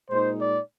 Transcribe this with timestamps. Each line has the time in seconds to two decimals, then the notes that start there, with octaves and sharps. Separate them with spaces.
0.11 A#2 G#3 D#4 C5
0.40 D5